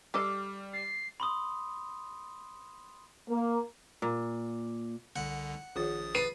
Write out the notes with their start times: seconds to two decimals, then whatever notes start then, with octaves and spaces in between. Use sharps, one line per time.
0.14 G3 E4 A4 D#5 D6 F6 C7
0.73 A6 C7
1.20 B5 C6 D#6
3.28 A#3
4.02 A#2
5.16 C2 D3 F#5
5.76 A#1 D#3 F4 G#4 D#6 A6
6.15 B4 C7 D#7